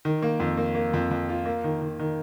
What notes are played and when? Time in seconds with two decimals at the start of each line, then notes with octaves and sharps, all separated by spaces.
0.05 D#3
0.22 A#3
0.40 F2
0.57 A#3
0.75 A#3
0.94 F2
1.11 F2
1.29 F4
1.46 A#3
1.64 D#3
1.82 D#3
1.99 D#3